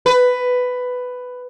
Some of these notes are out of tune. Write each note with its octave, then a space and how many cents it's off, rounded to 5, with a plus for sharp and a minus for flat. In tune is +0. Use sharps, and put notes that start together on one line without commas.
B4 +10